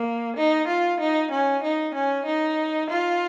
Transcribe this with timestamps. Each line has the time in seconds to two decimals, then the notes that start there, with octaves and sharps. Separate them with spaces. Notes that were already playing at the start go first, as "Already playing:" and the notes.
Already playing: A#3
0.37 D#4
0.68 F4
1.00 D#4
1.31 C#4
1.63 D#4
1.95 C#4
2.26 D#4
2.90 F4